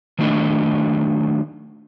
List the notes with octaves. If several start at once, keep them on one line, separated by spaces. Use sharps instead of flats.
D#3 F#3 A3 D4 D#5